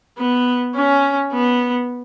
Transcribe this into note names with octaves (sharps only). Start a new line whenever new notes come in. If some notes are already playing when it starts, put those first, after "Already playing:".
B3
C#4
B3